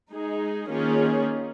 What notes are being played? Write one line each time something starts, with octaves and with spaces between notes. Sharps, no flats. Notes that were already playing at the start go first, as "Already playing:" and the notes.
G#3 D#4 G#4
D#3 A#3 C#4 F4 G#4